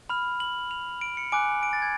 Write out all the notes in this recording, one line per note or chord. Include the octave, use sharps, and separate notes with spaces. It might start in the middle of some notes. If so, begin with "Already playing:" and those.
B5 F6 F7
F#7
F7
D7
C#7
G#5 D6 F#6 D7
D7
A6
G#6